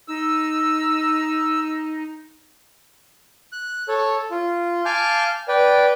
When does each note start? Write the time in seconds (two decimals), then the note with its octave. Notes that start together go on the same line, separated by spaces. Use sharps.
0.08 D#4 E6
3.53 F#6
3.89 A4 C#5
4.31 F4
4.85 F5 G#5 A5 D6 F6 G6
5.48 B4 D5 G5